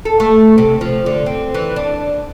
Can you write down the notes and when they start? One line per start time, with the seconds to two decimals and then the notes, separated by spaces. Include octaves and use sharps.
0.05 A4
0.20 A3
0.58 C3
0.81 F3
1.06 D3
1.26 C4
1.54 E3
1.76 D4